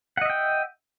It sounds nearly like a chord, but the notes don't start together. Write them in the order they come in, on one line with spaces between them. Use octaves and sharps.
F#5 D#5 E5 G5